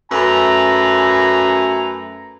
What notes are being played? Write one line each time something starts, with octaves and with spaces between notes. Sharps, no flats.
F#2 A3 B4 G#5 A#5